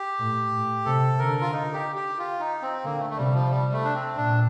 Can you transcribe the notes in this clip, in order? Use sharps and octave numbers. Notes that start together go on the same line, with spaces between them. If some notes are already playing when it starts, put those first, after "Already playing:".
Already playing: G4
A2
A2
C3 A4
D3 A#4
F4
D#4
G4
G4
F4
D#4
C4
D3 A#3
A3
A3
C3 G3
F3
G3
A3
D4
C4
A#2 D4